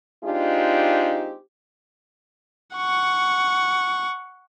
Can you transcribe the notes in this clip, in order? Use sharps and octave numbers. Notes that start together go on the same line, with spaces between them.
G#3 C4 D4 D#4 F4 G4
F#5 C#6